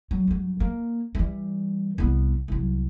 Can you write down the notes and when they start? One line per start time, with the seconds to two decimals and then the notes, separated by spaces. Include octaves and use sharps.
0.11 F#3
0.27 G2 F#3
0.60 A#3
1.15 E3 G3
1.98 C2 B3
2.48 C2 F#3